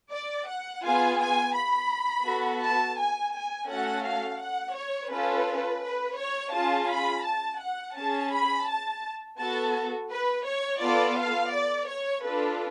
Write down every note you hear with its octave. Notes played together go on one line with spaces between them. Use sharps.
D5
F#5
B3 F4 G#4 G#5
G#5
B5
B3 F#4 A4
A5
G#5
G#5
A3 C#4 F#4 A4 F#5
F5
F#5
C#5
C#4 F4 A4 B4
B4
C#5
C#4 F4 G#4 A5
B5
A5
F#5
C#4 G#4 A5
B5
A5
B3 F#4 A4 A5
B4
C#5
B3 F4 A4 D5
F5
D5
C#5
D4 F4 A4 B4